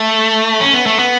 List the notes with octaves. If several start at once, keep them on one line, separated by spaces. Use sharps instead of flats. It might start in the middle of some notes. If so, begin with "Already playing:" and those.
Already playing: A3
C#4
B3
A3
B3